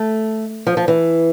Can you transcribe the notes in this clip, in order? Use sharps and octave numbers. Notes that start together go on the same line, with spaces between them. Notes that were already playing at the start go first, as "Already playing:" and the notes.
Already playing: A3
F3
F3
E3